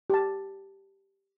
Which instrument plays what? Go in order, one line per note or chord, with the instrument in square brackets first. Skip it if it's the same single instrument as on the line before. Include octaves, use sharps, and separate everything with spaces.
[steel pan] G4 A5